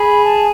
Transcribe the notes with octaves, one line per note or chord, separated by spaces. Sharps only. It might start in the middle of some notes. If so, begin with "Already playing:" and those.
Already playing: G#4 B5
A5